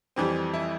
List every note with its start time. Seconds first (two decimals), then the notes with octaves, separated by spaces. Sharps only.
0.16 F2 E3 G3 C4
0.54 E4